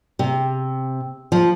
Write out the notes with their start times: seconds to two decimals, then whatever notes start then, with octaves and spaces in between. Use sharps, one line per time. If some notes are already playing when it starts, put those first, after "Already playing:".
0.19 C3
1.32 F3